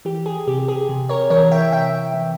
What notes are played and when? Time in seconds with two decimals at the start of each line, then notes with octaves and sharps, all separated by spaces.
0.05 E3 G4
0.26 G#4
0.47 C3 G4
0.68 G#4
0.89 C3
1.09 A#4 C#5
1.30 E3 A#4 C#5
1.52 E5 G5
1.72 C3 E5 G5
2.14 E3